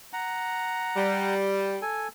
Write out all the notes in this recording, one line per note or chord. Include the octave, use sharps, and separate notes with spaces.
F#5 A#5
G3
A4 G#5